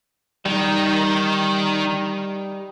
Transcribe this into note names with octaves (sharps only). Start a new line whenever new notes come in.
D#3 G3 D#4